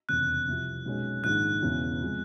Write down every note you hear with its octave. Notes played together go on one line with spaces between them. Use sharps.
F1 E2 C#3 F#6
C2 C3 F3
B1 B2 G#3 C#4
A#1 G#2 D#3 F#6
E1 E2 C#3 E3
C3 F3 G#3